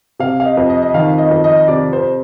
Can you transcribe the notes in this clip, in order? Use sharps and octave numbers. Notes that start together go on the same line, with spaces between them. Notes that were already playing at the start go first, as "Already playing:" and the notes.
C3 F5
F5
D#5
F2
D#5
D#5
D#3 F5
D#5
F2
D#5
C3 D5
C5